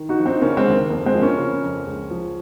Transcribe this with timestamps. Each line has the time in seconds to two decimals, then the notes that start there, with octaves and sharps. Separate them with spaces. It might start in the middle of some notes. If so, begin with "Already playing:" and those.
Already playing: D#3
0.09 D#4 F#4
0.18 F3
0.26 C4 D#4
0.41 C#3 A#3 C#4
0.57 G#3 C4
0.66 D#2
0.74 A#3
0.90 F2 A#3
1.06 G#3 C4
1.14 F3
1.22 A#3 C#4
1.38 C#3
1.62 F2
1.86 C#2
2.10 F3